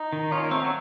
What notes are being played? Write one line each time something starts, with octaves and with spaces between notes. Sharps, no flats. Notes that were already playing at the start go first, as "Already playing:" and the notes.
Already playing: D#4
D#3
C#4 F4
A#3
A3 C4
F#3